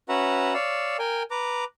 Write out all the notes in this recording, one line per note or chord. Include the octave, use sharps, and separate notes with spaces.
C#4 F#4 B4 E5 F#5 A#5
C#5 D5 F5 E6
A#4 G5 G#5
B4 A#5 D6